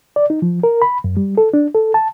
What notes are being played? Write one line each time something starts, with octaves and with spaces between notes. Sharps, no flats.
D5
D#4
F3
A#4
B5
F#2
G3
A4
D4
A4
A5